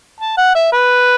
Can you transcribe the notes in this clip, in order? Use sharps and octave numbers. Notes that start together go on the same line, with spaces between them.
A5
F#5
E5
B4